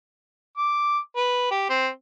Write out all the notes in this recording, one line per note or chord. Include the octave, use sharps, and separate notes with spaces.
D6
B4
G4
C4